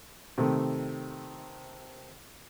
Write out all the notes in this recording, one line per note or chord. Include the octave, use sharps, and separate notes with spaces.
C3 D#3 A3